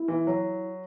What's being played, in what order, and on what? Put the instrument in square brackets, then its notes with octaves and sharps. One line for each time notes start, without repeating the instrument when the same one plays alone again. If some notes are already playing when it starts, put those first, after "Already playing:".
Already playing: [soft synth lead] E4
[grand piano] E3
F#3